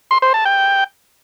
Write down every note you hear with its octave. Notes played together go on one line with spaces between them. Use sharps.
C6
C5
A5
G5